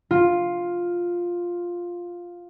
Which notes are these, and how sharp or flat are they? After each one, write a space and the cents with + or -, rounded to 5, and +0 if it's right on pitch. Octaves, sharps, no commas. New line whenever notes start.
F4 +5